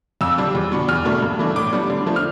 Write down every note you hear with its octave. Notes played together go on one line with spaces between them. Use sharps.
F2 E6
D3 G3 D4
E2
B2 B3 D4
E2 F6
B2 A3 D4
G2
E3 A3 D4
A2 D6
G3 B3 D4
D3
F3 A3 D4
F6